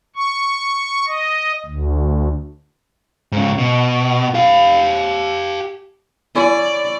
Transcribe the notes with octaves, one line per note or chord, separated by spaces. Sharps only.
C#6
D#5
D2
G#2 C#3
B2
G4 F5
E4 C#5 D5 G#5